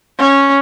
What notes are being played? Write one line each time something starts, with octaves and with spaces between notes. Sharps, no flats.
C#4